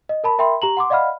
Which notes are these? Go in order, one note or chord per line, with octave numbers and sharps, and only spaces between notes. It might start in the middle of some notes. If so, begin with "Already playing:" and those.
D#5
A#4 A5 B5
A#4 E5 G5 B5 C6
G4 A#5 F#7
F#5 C6 D6
D5 D#5 F5 F#5 B5 F6